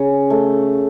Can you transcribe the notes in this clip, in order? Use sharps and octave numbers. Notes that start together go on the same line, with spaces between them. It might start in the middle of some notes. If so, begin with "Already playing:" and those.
Already playing: C#3
A3